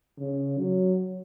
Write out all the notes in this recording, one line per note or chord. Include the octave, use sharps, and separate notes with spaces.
C#3
F#3